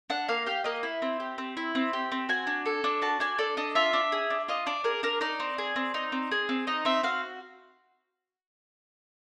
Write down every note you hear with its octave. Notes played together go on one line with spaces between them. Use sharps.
D4 F#5
A#3 F5
G4 F5
A#3 D#5
E4
C4
G4
C4
E4
C4
G4
C4
F#4 G#5
D4
A4
D4
F#4 A5
D4 G#5
A4 D5
D4 D#5
F4 E5
D4
G#4
D4
F4 D#5
D4 D5
G#4 A#4
D4 A#4
D#4 D5
C4
G#4
C4
D#4
C4
G#4
C4
D#4 D#5
C4 E5
F#4 F5